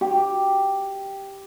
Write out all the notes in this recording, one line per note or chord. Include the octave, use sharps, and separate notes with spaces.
G4